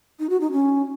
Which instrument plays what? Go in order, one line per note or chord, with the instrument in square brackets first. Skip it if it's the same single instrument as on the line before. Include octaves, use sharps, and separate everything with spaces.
[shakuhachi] D#4
F#4
D#4
C#4